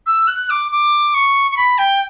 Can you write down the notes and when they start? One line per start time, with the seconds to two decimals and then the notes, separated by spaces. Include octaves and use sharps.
0.06 E6
0.28 F#6
0.50 D6
0.72 D6
1.14 C#6
1.51 C#6
1.57 B5
1.78 G5